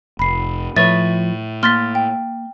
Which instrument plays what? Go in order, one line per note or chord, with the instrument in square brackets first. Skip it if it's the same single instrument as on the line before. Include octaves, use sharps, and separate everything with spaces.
[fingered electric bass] F1 [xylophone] B5 C7
[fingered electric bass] A2 [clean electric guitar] F3 B4 C#5 [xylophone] E5 A6
[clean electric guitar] A#3 C6 [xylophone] F6 A6 B6
[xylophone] G5